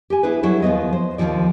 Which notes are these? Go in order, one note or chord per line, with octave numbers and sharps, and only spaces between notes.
G4 G#5
B3 E4 G#4 B4
F#3 G3 E4 A4
D#2 F3 B3 D#5
C5
D#2 B2 D#3 F3 D5